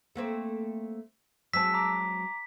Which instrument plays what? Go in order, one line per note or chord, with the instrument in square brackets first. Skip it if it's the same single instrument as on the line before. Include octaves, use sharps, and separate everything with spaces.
[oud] A3 A#3 C4
[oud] F#3 G#3 C4 [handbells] A5 E6 [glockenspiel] B6
[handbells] A#5 D6